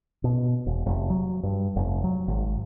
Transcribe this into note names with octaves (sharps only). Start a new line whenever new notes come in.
B2
E1
F1
F#3
G2
F1
F#3
G#1